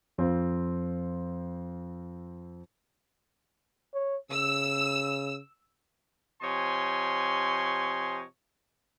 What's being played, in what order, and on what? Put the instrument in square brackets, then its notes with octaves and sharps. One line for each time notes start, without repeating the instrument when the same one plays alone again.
[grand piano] F2 C4 F4
[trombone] C#5
[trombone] C#3 [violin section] E6
[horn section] C3 F3 C#5 D#5 G#5 C6